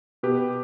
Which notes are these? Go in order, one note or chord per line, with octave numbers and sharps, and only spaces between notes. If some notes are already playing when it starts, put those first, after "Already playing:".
B2 G4 B4